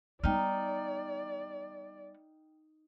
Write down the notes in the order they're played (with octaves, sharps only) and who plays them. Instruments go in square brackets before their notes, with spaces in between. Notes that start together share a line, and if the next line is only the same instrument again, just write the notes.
[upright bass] G3 B3 [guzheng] D#4 [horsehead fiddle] D5 [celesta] G5 F6